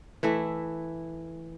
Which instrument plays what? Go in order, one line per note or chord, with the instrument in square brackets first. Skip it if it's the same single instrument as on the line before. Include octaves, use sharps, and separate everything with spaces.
[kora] E3 A3 E4